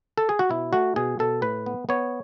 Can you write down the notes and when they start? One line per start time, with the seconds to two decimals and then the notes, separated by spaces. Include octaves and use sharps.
0.18 A4
0.29 G#4
0.39 F#4
0.49 B2 E4
0.73 A3 F#4
0.96 B2 G#4
1.19 B2 A4
1.42 A2 B4
1.66 B3
1.89 B3 C#5